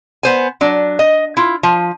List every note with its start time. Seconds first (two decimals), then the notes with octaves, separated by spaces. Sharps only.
0.23 B3 C5 G#5
0.61 F#3 D4
0.99 D#5
1.37 E4 F4
1.63 F3